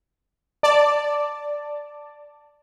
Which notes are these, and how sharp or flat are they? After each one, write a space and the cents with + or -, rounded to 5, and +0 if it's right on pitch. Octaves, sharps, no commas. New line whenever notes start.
D5 +0 A5 +10